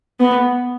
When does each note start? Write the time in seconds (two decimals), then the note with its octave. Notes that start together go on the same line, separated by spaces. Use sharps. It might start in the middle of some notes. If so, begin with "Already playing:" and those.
0.20 B3